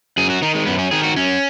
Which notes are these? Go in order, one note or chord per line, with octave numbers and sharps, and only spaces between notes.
F#2 G#4
F#4
D#3 D#4
G#3
F#2 B3
C#4
D#3 G#4
F#4
F#2 C#4